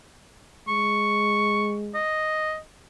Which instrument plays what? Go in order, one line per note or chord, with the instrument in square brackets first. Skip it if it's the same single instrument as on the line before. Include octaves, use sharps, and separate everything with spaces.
[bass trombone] G#3 [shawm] C#6
[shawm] D#5